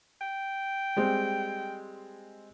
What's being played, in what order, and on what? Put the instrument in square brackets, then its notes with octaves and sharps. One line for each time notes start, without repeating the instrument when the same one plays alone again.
[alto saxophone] G5
[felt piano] G3 G#3 C4